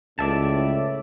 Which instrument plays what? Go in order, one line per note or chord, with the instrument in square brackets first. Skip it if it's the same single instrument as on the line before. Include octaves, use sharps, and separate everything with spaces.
[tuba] C#2 [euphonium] A2 [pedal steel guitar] D5 E5 A5